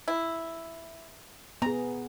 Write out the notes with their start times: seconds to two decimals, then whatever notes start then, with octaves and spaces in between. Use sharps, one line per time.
0.08 E4
1.62 B3 G#4 A#5